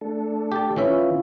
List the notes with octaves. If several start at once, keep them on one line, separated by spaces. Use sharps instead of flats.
A3 D4 A4
G4 A5
E3 C#4 E4 F4 E5